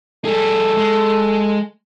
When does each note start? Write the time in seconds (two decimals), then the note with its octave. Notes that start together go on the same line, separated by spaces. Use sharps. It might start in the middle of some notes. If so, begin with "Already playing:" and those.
0.25 G3 G#4 A4
0.77 G#3